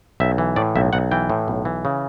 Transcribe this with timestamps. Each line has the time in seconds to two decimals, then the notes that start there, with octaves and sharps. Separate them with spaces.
0.20 B1 E5
0.38 E3
0.56 A2 D5
0.76 B1 E5
0.93 B1 F#5
1.11 E3 G5
1.30 A2
1.48 B1
1.65 E3
1.85 C#3